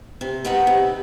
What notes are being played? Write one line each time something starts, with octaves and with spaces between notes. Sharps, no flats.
C3
D#3 G3 B3 D#4
C3